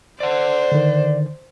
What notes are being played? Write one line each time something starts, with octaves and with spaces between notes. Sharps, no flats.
C5 D5 F#5
D3 D#3